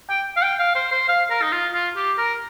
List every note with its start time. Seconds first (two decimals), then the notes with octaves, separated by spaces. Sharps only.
0.10 G5
0.36 F5
0.42 G5
0.59 F5
0.75 C5
0.92 C5
1.08 F5
1.30 A#4
1.41 D#4
1.52 F4
1.74 F4
1.96 G4
2.18 A#4